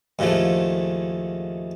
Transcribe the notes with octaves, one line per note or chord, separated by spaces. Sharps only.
D#2 A2 C#3 F3 A3